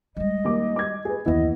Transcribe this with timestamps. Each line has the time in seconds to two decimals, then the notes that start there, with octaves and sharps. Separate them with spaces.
0.17 G3 G#3 D#5
0.44 D#2 A#3 D6
0.76 D6 G#6
1.05 G#4 B4
1.26 F#1 D#2 E3 B3 E4 D#5